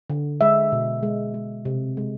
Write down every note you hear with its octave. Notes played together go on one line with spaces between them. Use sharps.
D3
G#3 E5
B2
G#3
G#3
C3
G#3